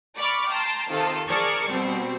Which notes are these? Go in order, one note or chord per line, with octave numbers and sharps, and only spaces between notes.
D5 B5 C#6 D6 F6
G5 A5 A#5 C6
C3 D#3 C4 F4 A4
G#4 A#4 D5 A5 C#6
B2 G3 C4